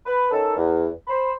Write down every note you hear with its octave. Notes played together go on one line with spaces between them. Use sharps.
B4
D#3 C#4 A4
E2
C5 B5